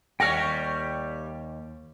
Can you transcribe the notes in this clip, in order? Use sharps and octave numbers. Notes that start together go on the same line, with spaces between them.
D#2 G3 C#5 G5 F6 F#6 A#6 C#7